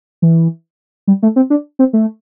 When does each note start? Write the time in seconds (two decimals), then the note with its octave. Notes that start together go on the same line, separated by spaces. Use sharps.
0.22 E3
1.07 G3
1.23 A3
1.36 C4
1.50 D4
1.79 C4
1.93 A3